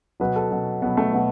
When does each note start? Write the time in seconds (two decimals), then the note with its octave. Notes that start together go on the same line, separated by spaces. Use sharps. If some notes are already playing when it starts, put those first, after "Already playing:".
0.20 B2 F#3 B4
0.36 A4
0.51 B2 F#3
0.82 B2 F#3 B3
0.97 A3
1.13 B2 F#3 B3